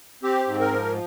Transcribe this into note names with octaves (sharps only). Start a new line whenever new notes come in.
C4 G4
G#2
A#4
F3